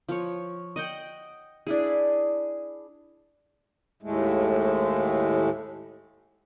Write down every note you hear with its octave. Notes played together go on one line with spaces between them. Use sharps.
F3 C#5
D#5 F#5 G5
D4 E4 G#4
D#2 A2 G#3 A3